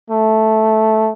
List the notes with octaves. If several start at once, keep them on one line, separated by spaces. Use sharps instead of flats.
A3